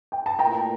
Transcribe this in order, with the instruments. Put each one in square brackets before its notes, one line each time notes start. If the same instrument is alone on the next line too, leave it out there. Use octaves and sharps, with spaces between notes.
[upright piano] G5
A5
[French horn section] A#2 A3 E4 A#4 [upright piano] G5 A#5